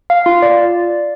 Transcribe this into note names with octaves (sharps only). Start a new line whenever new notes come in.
F5
F4
D5